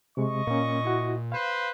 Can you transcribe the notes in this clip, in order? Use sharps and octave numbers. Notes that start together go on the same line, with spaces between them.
C3 G#3 D#5 C#6
A#2 A#3 C#4
E4 F#4
B4 C5 F5